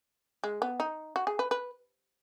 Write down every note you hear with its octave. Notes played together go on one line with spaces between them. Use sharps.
G#3
B3
D#4
F#4
G#4
B4
B4